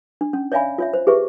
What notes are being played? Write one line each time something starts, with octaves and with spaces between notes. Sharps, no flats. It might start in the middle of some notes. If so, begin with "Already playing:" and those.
D4
C#4
C#5 D5 E5 F5 G#5 B5
F4 C#5 E5
C5
G4 G#4 B4 E5 C#6